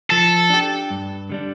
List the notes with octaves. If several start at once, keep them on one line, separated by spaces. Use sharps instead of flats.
F3 A4
D4 G4
G2
D3 G3 D4